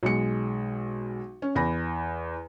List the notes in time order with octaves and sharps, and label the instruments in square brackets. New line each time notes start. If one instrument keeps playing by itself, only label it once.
[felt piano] B1 G#3 C#7
C#4
E2 B5 A#6